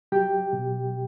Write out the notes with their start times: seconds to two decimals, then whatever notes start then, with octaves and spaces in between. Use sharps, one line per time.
0.12 F#3 G4 G5
0.53 B2